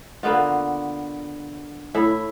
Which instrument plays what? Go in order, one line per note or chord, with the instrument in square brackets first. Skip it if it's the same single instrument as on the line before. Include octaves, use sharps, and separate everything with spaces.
[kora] D3 A#3 B3 F4
A2 E4